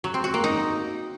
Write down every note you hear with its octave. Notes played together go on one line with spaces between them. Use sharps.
F#3
C4
F#4
A#3
D#4